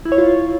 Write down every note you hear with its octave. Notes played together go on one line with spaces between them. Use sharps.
E4
C#5
F4